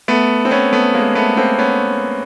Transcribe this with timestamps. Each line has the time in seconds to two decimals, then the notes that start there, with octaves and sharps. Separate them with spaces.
0.08 A3 B3
0.45 C4
0.51 B3 C#4
0.72 A3 B3
0.94 G#3 A#3
1.15 A3 B3
1.37 A#3 C4
1.59 B3 C#4